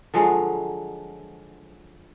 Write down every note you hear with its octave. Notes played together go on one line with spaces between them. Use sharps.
D3 F3 F#3 G#3